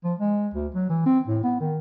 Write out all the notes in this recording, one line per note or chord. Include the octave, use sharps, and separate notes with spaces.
F3
G#3
D2
F#3
E3
C4
A2
B3
D#3